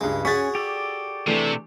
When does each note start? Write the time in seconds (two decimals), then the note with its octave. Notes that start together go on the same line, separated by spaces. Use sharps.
0.01 C#2 G2 G#3
0.25 C#4 F#4 G#4 F#6 A6 B6
0.55 G4 A4 D5
1.27 C3 E3 A3 D4